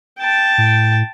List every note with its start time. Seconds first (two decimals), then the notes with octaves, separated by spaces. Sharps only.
0.19 G5 A5
0.58 A2